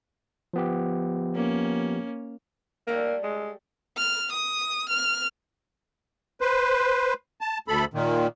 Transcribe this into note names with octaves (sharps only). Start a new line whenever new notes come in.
F3 B3 G4
A#3 C#4
G3 A3 A#3 A#4
G#3
F6
D#6
F6
B4 C5
A5
D2 A4 B5
A#2 D#3